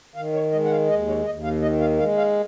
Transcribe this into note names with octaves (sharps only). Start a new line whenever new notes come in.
D#3 F5
C#5
G#3 D#5
F#5
F5
D#2 D#5
C#5
D#2 D#5
F5
D#3 D#5
F5
G#3 F5
F5